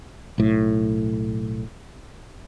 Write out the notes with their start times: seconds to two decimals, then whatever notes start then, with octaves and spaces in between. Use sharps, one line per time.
0.38 B1 A2